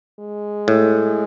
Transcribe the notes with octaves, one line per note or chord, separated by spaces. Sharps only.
G#3
A2